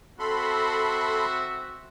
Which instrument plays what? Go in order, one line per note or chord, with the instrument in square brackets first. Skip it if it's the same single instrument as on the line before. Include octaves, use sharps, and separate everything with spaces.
[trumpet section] C4 F#4 E5 [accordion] A4 B5 C6